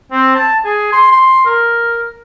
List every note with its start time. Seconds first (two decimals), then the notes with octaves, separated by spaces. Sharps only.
0.12 C4
0.35 A5
0.65 G#4
0.92 C6
1.11 C6
1.46 A#4